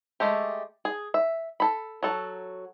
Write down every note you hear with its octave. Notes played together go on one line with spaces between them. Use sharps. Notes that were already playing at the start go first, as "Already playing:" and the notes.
G#3 A3 G4
G#4
E5
A4 B5
F#3 A4